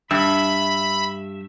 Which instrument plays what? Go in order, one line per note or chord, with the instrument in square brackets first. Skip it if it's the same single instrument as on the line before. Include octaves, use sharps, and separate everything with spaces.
[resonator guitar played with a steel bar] G2 [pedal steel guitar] E5 [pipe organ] B5